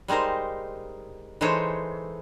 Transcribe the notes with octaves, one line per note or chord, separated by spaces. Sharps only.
G3 G#3 D#4 A#4 C5
E3 G#3 D#4 A4 C5 C#5